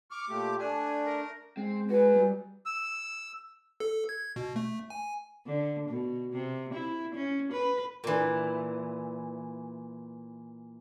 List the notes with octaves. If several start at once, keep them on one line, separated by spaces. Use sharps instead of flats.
C#6 D6 F6
A#2 A3 G4
A3 D4 G#5
A#4
G#3 C4
F#4 B4 G#5
G3
E6
A4
G#6
B2
A3
G#5
D3
B2
C3
E4
C#4
B4
A#2 E3